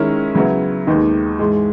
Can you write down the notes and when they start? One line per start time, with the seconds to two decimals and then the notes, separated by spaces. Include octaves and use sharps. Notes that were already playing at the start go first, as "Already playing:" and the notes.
Already playing: D#3 G#3 C#4 E4 A#4
0.35 C#3 F#3 B3 E4
0.87 D#2 D#3 G#3 B3 D#4
1.39 G#2 E3 G#3